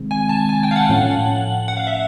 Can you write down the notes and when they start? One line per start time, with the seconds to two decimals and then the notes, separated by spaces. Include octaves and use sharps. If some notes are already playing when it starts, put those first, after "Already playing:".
Already playing: C3 D#3 G#3 C4
0.11 G#5
0.29 A5
0.49 G#5
0.63 G5
0.71 F5
0.76 F#5
0.89 A2 F3 A3 C#4
1.68 F#5
1.77 F5
1.87 E5